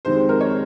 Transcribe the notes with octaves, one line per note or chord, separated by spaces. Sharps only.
F2 C3 D#3 G#3 C4 C5
A#4
C#5